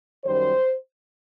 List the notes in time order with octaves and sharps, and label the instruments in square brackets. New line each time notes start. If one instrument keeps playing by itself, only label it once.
[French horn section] F#2 D#3 G3 C5